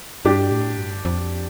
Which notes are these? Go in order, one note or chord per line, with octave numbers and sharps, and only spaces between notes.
G2 D4 G4
A2
G2
F2